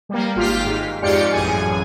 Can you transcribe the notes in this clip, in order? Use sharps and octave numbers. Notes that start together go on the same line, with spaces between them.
G3 A#3
G#1 F4 G4 F6 B6
G#2
F2 G#2 F4 G4 D5 C#7
A1 F#2 G#4 G#5